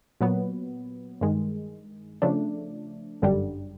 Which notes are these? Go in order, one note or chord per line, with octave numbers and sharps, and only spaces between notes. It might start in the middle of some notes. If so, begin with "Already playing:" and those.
A#2 F#3 B3
G2 D#3 G#3
C#3 F3 A3 D4
G1 F#2 D3 G3